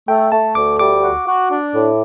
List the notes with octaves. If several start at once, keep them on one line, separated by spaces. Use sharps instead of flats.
A3 G5
A3 A5
D2 D6
G3 D6
F#4
F#4
D4
A2